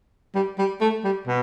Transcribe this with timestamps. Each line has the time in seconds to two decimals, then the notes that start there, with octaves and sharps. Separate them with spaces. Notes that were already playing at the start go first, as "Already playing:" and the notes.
0.35 G3
0.58 G3
0.81 A3
1.04 G3
1.27 B2